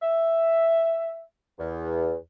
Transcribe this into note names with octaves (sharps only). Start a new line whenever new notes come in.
E5
E2